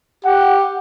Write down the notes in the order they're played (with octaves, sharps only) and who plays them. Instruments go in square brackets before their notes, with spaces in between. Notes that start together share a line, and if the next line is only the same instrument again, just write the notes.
[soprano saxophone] G4 [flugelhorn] F#5